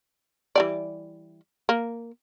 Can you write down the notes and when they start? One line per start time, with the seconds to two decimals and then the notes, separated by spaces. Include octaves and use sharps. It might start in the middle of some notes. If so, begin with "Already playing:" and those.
0.55 E3 G3 D5
1.69 A#3